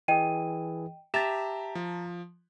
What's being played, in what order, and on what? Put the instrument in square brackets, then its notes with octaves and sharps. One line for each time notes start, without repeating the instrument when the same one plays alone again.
[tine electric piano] E3 G#4 [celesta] D#5 G5 D#7
[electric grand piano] G4 E5 [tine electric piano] A5 A#5 [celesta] A6 E7
[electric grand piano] F3